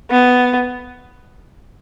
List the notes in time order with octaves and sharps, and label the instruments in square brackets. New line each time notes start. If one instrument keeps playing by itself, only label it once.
[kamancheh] B3